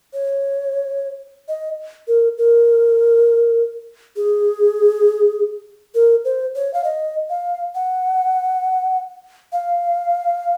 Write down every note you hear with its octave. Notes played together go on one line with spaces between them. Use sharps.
C#5
D#5
A#4
A#4
G#4
A#4
C5
C#5
F5
D#5
F5
F#5
F5